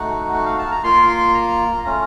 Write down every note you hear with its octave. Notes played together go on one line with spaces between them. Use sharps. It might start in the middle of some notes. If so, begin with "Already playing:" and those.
Already playing: A3 D#4 F#4 F#5
F#5
F5
A5
A#5
A#3 F4 C6
C6
A#5
A3 C#4 F4 A#5